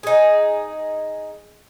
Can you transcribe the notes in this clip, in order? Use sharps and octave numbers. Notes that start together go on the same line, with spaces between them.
D#4 G#4